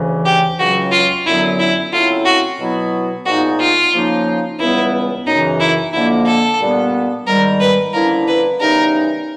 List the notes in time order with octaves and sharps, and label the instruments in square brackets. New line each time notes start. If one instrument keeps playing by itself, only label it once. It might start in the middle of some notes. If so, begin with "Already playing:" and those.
Already playing: [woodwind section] D2 C#3 E3
[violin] G4
[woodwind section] C#2 C#3 F#3 [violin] F#4
[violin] F4
[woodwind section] F#2 D3 F#3 B3 [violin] E4
[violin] E4
[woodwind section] C#3 F#3 A3 C4 E4 [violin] F4
[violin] F#4
[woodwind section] B2 F#3 B3 E4
[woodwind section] A#2 F3 G#3 B3 D#4 [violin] F#4
[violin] F4
[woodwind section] C#3 F3 A#3 D#4
[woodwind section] C#2 C#3 E3 G3 B3 [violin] E4
[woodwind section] F#2 C#3 E3 [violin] D#4
[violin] E4
[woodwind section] F2 D3 F3 A#3 [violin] E4
[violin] A4
[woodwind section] A#2 G3 B3 D4
[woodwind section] G#2 D#3 G3 [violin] A#4
[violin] B4
[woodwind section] D3 F3 A#3 C#4 E4 [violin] A#4
[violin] B4
[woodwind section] C#3 E3 G3 B3 D#4 [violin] A#4